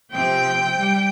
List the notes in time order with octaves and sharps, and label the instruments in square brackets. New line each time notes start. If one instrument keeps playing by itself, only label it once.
[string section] C3 F3 C4 [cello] G5
[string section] G3